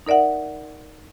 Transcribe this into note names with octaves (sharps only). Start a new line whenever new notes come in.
D#4 A#4 D5 E5 F#5